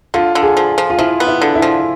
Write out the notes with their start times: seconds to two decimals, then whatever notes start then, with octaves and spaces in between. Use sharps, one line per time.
0.14 D3 F4
0.35 D3
0.43 G#4
0.57 F3
0.78 F3
0.90 F4
0.99 F3 E4
1.20 B3
1.27 E4
1.41 D3
1.55 E4
1.62 F3